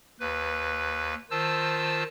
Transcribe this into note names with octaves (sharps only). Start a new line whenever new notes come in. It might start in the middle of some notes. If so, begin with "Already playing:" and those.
D#2 B4
D#3 F4 C5 A5 E6